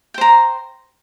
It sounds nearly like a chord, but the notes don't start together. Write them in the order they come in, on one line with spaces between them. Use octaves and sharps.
G5 C5 A#5